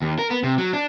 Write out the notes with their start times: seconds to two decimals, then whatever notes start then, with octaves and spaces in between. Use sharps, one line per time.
0.02 D#2
0.19 A#4
0.30 B3
0.43 C3
0.58 F#3
0.73 D4